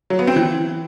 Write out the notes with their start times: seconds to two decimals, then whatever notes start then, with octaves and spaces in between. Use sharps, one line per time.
0.10 F#3
0.19 B3
0.27 C4
0.36 E3